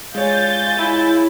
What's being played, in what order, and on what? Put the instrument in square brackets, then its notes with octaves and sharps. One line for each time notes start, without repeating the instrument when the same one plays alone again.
[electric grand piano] G#3 C#5 [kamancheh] F4 G#5 [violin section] G6 A6
[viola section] E4